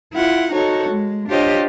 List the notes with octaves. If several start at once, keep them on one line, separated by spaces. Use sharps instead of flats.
E4 F4 F#5
D#4 F#4 A4 C#5
G#3
D4 F4 G4 C5 C#5 D#5